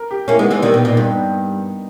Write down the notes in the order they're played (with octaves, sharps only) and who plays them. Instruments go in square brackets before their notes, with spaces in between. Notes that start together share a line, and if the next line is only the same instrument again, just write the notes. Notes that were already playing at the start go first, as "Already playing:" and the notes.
Already playing: [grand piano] A#4
G4
[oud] A#3 C#4 [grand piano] E4
[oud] G#3 B3 [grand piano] D#4
[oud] E3 G#3 [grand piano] B3
[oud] D#3 G3 [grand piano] A#3
[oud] B2 [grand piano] B3
[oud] A#2 [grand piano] D#4
[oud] G2 [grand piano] D#4
[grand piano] B3